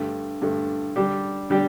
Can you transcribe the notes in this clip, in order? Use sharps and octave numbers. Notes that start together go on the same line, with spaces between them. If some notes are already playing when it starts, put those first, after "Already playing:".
Already playing: G2 D3 A3
G2 D3 A3
D3 G3 D4 G4
D3 G3 D4 G4